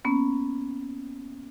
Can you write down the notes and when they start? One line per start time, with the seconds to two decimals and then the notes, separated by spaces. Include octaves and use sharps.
0.05 A#3 B3 C#4